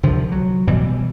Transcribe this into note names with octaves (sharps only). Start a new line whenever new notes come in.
C2 D3 F3
F#3
B2 E3 G3